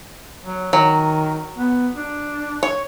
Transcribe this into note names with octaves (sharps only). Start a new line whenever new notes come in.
F#3
D#3 F#3
B3
D4
C#5